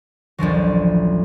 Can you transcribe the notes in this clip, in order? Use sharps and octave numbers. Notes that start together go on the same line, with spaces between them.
A1 D2 F3 F#3